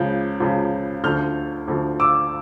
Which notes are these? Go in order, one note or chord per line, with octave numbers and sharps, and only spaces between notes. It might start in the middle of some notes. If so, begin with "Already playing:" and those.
Already playing: C#2 C#3 F3 G6
C#2 C#3 F3
D2 D3 F3 F6 G6
D2 D3 F3
D6 E6